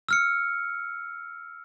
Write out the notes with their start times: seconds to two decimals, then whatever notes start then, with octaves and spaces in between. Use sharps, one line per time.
0.09 E6 F6 C#7